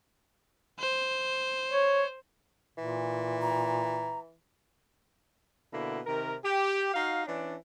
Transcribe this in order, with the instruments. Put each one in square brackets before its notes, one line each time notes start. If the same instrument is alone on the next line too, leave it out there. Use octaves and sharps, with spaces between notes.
[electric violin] C5
[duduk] C#5
[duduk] A#2 [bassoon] E3
[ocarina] A#5
[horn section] B2 D3 A#3 E4
C3 D#3 A#4
G4
D#4 F#4 F5
E3 C#4 D4